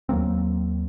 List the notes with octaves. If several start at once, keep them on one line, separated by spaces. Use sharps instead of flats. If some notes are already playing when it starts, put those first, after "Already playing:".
D#2 F#3 A#3 C4